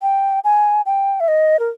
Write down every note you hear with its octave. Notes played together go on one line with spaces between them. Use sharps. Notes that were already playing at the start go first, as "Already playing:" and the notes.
G5
G#5
G5
E5
D#5
A#4